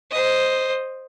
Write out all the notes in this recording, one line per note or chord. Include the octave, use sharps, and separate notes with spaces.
C5 D#5